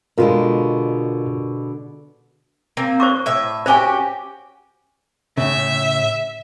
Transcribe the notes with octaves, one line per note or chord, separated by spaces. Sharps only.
B2 D3 G#3 F4 A#4
A#3 C4
C5 C#6 D6
A2 E5
C#4 F#4 G4 C5 G#5
A2 C#3 E5